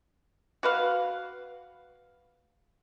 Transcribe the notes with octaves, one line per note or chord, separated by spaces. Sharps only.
F#4 B4 F5